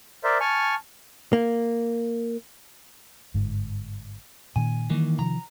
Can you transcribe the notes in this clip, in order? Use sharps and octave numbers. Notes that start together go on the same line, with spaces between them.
A#4 C5 D5 E5
G#5 A5 C#6 F6
A#3
G1 G#2
A#2 D#3 G#5
D#3 E3 G3 A#3
C3 D#3 F3 A#5